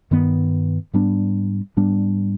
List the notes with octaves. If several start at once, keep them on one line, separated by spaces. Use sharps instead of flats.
G2 D#3 B3
G#2 G3 B3 D4
G#2 G3 B3 D4